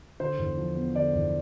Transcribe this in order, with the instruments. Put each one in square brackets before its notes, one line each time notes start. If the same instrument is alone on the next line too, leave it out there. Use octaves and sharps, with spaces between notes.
[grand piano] D3 C5
E2
F3
B3
D3 D5
E2